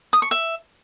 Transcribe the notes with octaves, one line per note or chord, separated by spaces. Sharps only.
D#6
C#6
E5